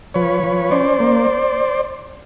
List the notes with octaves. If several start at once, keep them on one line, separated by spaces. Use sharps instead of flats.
F3 B4 C#5
F3
C#4 C5 D5
A#3